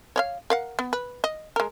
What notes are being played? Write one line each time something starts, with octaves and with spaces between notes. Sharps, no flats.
C#5 D5 F5
A#4 F5 F#5
B3
B4
D#5
G#3 A#4